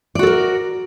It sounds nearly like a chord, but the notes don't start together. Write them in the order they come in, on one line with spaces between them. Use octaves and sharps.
D5 F#4 A4 A#4